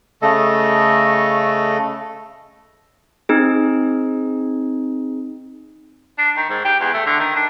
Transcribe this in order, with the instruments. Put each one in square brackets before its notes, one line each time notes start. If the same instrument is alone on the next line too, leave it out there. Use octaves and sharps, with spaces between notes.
[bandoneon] C#3 A3 A4 D#5
[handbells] C4 D#4 G#4
[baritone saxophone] D4
D#3
G#2
G4
E2
A3
D3
D#3
D4